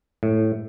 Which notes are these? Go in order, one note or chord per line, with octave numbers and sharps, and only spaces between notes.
A2